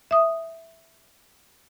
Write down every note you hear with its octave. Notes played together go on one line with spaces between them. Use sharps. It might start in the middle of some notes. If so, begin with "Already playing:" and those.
E5 D#6